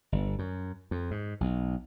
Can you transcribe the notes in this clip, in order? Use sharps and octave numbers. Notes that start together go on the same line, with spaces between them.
G1
F#2
F2
G#2
B1